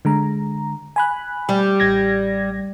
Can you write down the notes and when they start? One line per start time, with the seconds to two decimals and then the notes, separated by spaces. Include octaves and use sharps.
0.05 D3 G#3 A#5
0.96 G#5 B5 F#6
1.49 G3
1.80 A1 G#6 A#6